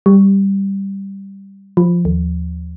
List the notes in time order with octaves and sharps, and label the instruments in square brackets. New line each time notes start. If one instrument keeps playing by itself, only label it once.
[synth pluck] G3
F3
D#2